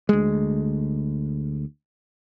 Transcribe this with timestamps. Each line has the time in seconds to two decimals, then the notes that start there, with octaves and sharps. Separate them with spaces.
0.09 D2 G#3